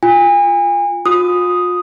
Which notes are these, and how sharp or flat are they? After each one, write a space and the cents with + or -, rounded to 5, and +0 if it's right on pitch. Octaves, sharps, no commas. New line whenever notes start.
F4 +0 G#5 -35
F4 +40 D#6 +0